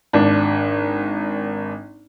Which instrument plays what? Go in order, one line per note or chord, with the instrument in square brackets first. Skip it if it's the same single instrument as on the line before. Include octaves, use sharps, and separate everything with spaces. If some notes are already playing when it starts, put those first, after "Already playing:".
[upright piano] G#1 D4